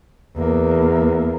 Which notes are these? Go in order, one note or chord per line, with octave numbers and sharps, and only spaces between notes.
E2 A#3